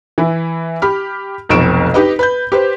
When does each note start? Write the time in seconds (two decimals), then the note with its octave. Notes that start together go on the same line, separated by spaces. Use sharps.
0.18 E3 E4
0.82 G4 B5 F6
1.49 F1 B1 F2 C#6 D7 E7
1.94 D#4 G4 B4 D#5
2.19 B4 B5 G6
2.52 G4 B4 C5